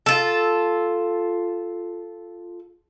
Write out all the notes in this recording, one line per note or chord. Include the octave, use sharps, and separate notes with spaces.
F4 A4